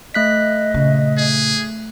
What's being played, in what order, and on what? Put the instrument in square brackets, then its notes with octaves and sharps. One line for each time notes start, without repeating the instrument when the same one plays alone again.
[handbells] A3 F#6 B6 [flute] D#5
[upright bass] A#2 C#3
[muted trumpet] G#4